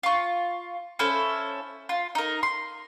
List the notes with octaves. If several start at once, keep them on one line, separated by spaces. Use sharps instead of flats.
F4 C#6
C#4 E4 A4 C5
F4
D#4 A#4
C6